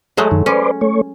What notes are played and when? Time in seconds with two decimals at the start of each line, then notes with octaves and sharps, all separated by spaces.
0.17 F#3 G#3 A3 G#4 D#5
0.31 F#2 D#3
0.46 C#4 B4 C5 D5
0.81 A3 C#5